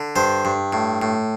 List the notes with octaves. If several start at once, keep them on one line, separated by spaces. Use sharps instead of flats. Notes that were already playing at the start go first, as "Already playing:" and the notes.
Already playing: D3
G2 C5
G2
A2
A2